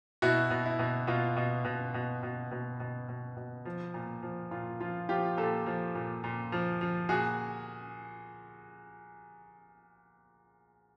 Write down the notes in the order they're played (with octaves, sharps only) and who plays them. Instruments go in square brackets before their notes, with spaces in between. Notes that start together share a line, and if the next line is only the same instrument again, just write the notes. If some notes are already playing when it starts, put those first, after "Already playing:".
[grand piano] B2 E4 F#4
B2
E4
B2
B2 F4
B2
B2
B2
B2
B2
B2
B2
B2
F3
A#2
F3
A#2 F4
F3 F4
F3 F4 G4
A#2 G4 A4
F3
A#2
A#2
F3
F3
A#2 F#4 G#4